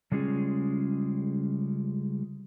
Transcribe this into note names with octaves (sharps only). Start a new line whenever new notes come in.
C#3 G3 G#3 C#4 F4 G#4